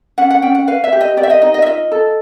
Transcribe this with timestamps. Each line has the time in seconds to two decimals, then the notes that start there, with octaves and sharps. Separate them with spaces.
0.18 C#4 F#5
0.31 F#5
0.42 C#4 G5
0.55 F#5
0.67 B4 F5
0.84 E5
0.92 G4
1.01 D#5
1.17 G4 D5
1.23 E5
1.30 D#5
1.42 D#4 D#5
1.54 D#5
1.62 E5
1.66 F4 D#5
1.92 A4